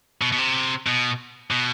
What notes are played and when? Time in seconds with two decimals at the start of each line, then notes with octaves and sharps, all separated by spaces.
0.21 B2
0.32 B2
0.38 C3
0.87 B2
1.51 B2